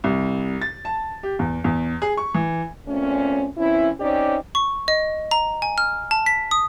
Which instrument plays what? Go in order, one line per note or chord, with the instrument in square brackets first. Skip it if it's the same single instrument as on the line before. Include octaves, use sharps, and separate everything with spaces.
[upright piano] C2
A6
A5
G4
E2
E2
G#4
C#6
E3
[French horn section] A#2 A3 C4 C#4
E3 C4 C#4 E4
C4 C#4 D#4 G4 C#5 D5
[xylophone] C#6
D#5
A#5
G#5
F6
A5
B6
D#6